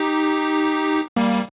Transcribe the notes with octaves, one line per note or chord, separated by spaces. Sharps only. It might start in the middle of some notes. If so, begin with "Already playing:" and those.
Already playing: D#4 G4
G3 A#3